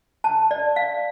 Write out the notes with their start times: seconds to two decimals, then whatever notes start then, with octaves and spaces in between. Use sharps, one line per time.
0.24 A5
0.51 D5
0.76 F5